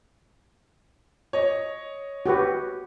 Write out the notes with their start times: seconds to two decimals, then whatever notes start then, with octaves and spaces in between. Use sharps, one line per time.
1.33 C#5 D#5
2.26 F#4 G4 B4